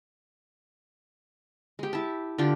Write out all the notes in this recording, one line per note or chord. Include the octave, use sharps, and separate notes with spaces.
G#3 G4
E4 A5
D3 D4 F4 G4